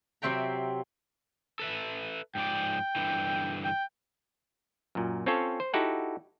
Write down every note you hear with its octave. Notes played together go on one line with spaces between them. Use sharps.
C3 F#3 C4 E5 G5 A#5
A4 B4 E5
G#2 F3 D5 G5
G2 D3 E3
G5
F#2 A#2
C4 C#4 F4 A4 C#5
C5
D#4 E4 F#4 G4 A4 F#5